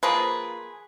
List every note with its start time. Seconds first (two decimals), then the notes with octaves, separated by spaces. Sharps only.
0.03 F3 A#3 G#4 B4